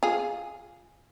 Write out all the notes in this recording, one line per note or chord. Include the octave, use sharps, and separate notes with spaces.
F4 G#4